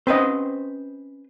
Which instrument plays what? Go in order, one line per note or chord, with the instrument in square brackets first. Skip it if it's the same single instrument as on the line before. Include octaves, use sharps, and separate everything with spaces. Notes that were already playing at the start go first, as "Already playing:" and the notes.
[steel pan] C4 D#5 [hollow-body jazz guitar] C#4 B4 C5